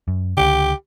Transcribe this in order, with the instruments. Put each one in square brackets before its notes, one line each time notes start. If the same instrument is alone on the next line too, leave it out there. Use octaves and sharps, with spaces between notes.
[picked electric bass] F#2
[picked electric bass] C#2 D3 [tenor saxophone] G4